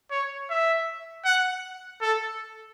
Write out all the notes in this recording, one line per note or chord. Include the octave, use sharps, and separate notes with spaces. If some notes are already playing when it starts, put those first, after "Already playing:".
C#5
E5
F#5
A4